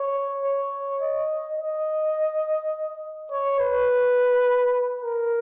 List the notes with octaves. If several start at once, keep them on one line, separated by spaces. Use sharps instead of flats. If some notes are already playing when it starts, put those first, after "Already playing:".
Already playing: C#5
C#5
D#5
D#5
C#5
B4
A#4